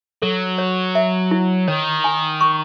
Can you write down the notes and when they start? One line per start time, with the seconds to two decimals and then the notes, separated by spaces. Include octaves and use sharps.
0.22 F#3 A4
0.58 C#5
0.95 E5
1.31 E4
1.68 D#3 C#5
2.04 G#5
2.41 C#6